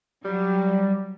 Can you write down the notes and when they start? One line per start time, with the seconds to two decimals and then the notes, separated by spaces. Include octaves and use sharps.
0.24 F#3 G3